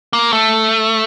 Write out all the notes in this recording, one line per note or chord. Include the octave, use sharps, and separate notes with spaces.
A#3
A3